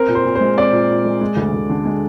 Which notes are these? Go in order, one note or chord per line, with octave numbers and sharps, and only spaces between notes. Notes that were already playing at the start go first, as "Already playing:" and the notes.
Already playing: C4 A#4
A#2
C5
A#2
C5
G#3
C4 D5
A#2
A#2
G#3
G#3
D2
D2
D3
G#3